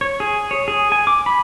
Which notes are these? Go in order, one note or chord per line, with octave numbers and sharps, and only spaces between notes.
C#5
G#4
C#5
G#4
G#5
D6
B5